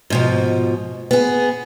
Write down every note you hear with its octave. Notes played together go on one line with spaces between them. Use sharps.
G#2 B2 F3
B3 G#4